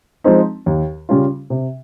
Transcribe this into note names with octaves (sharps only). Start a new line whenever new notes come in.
F3 G#3 C4 D#4
D#2
C#3 G3 C#4 F4
C3